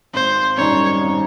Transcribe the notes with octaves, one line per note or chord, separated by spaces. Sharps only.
G#1 C5
F#2 D#3 G3 C#5
G#1